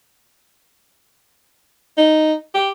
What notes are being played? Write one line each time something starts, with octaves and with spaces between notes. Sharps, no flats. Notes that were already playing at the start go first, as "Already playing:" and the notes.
D#4
G4